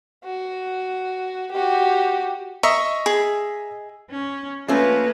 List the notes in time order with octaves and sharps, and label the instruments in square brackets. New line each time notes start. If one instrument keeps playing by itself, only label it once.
[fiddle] F#4
F#4 G4
[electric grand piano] D#5 E5 A#5 [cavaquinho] C#6
[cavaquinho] G#4
[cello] C#4
[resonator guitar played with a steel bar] F3 A3 C#4 [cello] A#3 B4